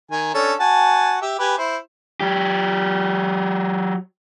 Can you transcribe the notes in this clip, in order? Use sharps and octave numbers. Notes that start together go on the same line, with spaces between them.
D#3 G#5
C#4 D4 A4
F#4 G#5 A5
G4 E5
G4 B4 G#5
E4 C5
F#3 G4